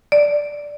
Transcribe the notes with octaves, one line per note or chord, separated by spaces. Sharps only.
D5